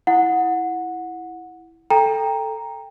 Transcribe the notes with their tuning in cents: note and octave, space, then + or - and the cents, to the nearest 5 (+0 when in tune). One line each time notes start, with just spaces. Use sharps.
E4 +0 F#5 -15
A4 +0 G5 +20 A#5 +0